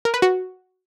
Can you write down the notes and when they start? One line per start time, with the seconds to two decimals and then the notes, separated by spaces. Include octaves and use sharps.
0.05 A#4
0.14 B4
0.22 F#4